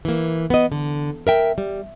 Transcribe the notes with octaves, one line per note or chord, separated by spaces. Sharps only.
E3 A#3
B3 D#5
D3
A#4 E5 G5
G3